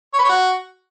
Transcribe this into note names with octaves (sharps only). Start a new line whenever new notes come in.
C#5
B4
C#5
F#4